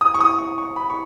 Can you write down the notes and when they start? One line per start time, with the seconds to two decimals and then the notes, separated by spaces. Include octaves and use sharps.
0.01 D#6
0.14 C#6
0.21 D#6
0.38 C#6
0.58 C#6
0.76 B5
0.90 C#6